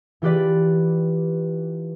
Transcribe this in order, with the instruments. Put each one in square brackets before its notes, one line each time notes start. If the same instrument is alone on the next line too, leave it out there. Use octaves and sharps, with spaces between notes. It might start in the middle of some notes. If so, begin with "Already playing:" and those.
[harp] E3 F4 G4 B4 D5